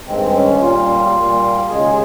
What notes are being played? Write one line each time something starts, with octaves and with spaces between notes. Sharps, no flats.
G2 D#3 G#3 C4
C#4
A#2 G3 A#3 F4
A#2 G3 A#3
D#2 C#3 G#3 G#4